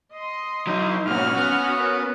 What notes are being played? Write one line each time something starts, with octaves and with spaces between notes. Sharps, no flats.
D#5 C6
F#3 D#4 E4
G2 A#2 C#4 F#4 F#5 F6
B3
A#4